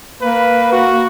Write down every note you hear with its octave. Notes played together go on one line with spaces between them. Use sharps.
A#3 B4
F#4